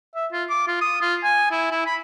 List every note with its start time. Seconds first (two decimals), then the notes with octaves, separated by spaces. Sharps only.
0.15 E5
0.32 F4
0.50 D6
0.68 F4
0.81 D#6
1.01 F4
1.24 G#5
1.51 E4
1.71 E4
1.86 B5